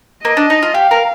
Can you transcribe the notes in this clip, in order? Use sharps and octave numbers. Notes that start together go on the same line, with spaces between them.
A#3 D#5
D4
D#4
F4
G4 F5
A#4